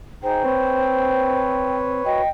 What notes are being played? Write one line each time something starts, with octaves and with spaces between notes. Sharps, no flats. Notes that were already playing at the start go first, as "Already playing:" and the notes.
D#4 G#4 C5 G5
C4 B4 C#5
F#4 D#5 G5